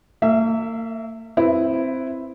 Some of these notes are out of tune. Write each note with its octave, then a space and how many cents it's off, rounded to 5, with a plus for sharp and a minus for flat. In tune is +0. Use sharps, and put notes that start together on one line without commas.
A#3 -40 E5 +0
C4 +0 E4 +0 B4 +0